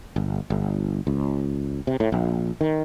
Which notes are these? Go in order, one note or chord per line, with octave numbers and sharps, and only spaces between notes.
G1
G1
C#2
C3
A2
A#1
D#3